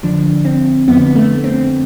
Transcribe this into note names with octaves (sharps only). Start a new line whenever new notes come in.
F2 D3 F3 D4
C4
F2 D3 F3 B3
A3
C4